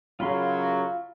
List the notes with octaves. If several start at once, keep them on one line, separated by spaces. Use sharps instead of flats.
F#2 C#3 F#3 F4 B5 C6